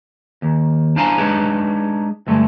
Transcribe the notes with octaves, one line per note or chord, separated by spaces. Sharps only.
D#2
D4 E4 C5 F5 G#5 A#5
G#3 D4 D#4 G#4 B4 C#5
D2 G2 G#3 A3